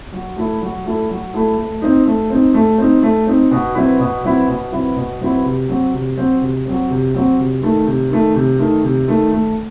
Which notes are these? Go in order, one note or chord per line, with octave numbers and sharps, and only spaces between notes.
F#3
A3 E4 A4
F#3
A3 E4 A4
F#3
A3 E4 A4
A3
C4 D#4
A3
C4 D#4
A3
C4 D#4
A3
C4 D#4
B2
F#3 C4 E4 B4
B2
F#3 C4 E4 B4
B2
F#3 C4 E4 B4
B2
F#3 C4 E4 B4
C3
F#3 C4
C3
F#3 C4
C3
F#3 C4
C3
F#3 C4
C3
D#3 A3
C3
D#3 A3
C3
D#3 A3
C3
D#3 A3
A3